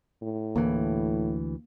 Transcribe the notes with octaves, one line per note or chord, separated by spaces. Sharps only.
A2
D2 E3 A#3